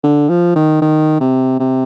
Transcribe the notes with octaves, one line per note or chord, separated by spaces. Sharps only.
D3
F3
D#3
D#3
C3
C3